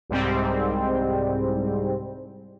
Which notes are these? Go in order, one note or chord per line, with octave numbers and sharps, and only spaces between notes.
C2 G#2 G3 C4